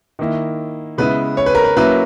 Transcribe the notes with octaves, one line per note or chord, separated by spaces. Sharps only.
D#3 A#3 E4
C#3 G#3 B3 E4 B4
C#5
B4
A#4
B4
F#3 A#3 C#4 E4 B4